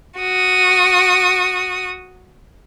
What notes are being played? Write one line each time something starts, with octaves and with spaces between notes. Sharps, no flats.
F#4 D#6